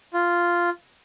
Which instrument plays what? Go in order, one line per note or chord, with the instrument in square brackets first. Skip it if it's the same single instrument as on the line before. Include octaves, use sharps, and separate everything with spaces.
[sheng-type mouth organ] F4